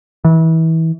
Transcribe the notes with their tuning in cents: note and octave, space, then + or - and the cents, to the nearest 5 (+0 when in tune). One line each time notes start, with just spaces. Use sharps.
E3 -30